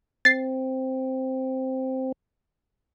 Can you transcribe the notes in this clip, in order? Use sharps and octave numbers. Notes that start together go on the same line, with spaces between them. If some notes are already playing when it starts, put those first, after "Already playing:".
C4 A6 C7